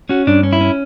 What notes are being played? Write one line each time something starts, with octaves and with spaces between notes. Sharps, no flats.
C#4 F#4
G2 D4
C#4
E4
C#4